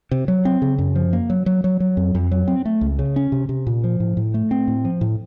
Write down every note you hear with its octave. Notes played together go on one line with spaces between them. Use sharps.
C3
F#3
C4
C#3
F#2
F3
A#3
F#3
F#3
F#3
F#3
F2
F2
F#3
C4
A3
C#2
C#3
C#4
C3
C3
A#2
F3
A2
A2
A3
C4
A2
F3
A2